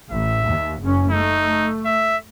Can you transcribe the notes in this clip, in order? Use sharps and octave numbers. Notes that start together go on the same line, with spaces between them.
A1 E5
D#2
F#1 C#4
A3 D#4
E5